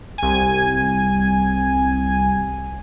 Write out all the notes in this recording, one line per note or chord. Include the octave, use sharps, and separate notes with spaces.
C2 G#5